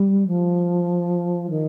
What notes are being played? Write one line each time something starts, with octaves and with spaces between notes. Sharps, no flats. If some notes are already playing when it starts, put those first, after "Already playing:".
Already playing: G3
F3
D#3